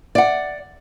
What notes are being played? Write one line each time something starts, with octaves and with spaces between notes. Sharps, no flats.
D5 F#5